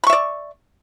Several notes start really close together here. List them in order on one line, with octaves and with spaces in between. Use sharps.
B5 C#6 E5 D5